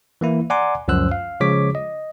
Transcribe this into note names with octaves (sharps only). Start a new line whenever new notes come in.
E3 A#3 E4
D5 F#5 G#5 A#5 C6 D6
C#2 F#2 F3 C5 E6 F#6
F5
C#3 F3 G#3 C#5 D6 B6
D#5